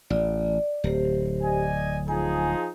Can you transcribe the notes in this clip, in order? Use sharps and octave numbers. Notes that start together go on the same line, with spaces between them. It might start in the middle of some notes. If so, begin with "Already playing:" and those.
A1 D5
D1 G4 C5
D5 D#5 G#5
F3 D#4 G#4 G#5